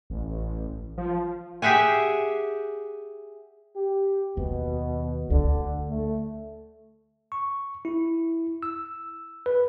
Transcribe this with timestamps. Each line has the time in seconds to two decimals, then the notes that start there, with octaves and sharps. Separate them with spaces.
0.10 A1
0.98 F3
1.62 G4 G#4 E5 F#5 G#5
3.76 G4
4.37 D#2 B2
5.30 D2 D3
5.90 A3
7.32 C#6
7.85 E4
8.63 E6
9.46 B4